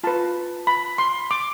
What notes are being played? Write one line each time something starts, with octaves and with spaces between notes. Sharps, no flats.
F4 B4 A5
B5
C6
D6